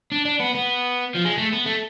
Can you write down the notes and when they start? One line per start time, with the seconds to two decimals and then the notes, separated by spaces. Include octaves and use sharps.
0.12 D4
0.25 D4
0.40 B3
0.54 B3
1.15 F3
1.24 G#3
1.38 A3
1.53 B3
1.66 A3